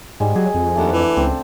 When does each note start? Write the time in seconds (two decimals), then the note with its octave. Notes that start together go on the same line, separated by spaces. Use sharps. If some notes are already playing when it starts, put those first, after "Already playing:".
0.20 G#2 G3 G#3
0.35 F#3 G#4
0.54 F2
0.76 D#2 A3 D4 F#5
0.92 E3
1.17 C#2 C4 C5